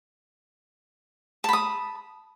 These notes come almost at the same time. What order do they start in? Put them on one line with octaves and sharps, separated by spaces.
A5 B5 D#6